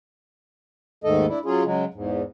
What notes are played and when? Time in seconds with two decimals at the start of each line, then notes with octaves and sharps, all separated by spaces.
1.04 D#2 G#2 D#3 A3 A4 D#5
1.28 D4 E4
1.45 F#3 C#4 F4 G#4
1.64 C#3 F#3 G#3
1.94 E2 G#2